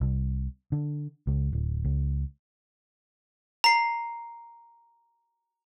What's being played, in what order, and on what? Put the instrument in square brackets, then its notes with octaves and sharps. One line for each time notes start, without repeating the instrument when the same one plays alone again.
[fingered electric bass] C2
D3
C#2
D1
C#2
[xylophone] A#5 C7